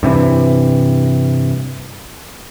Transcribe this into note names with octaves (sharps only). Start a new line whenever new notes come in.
G2 C3 E3